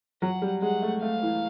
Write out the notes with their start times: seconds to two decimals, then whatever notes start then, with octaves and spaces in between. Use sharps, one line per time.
0.22 F#3 F#5
0.42 G3
0.62 G#3 F#5
0.82 A3
1.02 A3 F5
1.22 E3